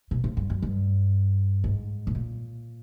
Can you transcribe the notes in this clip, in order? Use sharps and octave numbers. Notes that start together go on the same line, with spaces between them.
B2
A2
G2
F#2
G2
G#2
B2
A#2